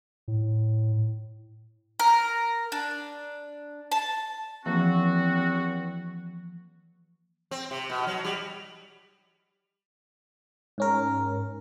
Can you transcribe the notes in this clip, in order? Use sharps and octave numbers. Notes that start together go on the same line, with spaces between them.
A2
A#4
D4
A5
E2 E3 F3 A#3 C4 F#4
C4
C3
B2
F#3
G3
G#2 C#4 A#4